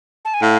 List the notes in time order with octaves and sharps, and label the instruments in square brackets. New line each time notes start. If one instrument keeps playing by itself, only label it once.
[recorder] A5
G#5
[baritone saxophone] A2 [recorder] F5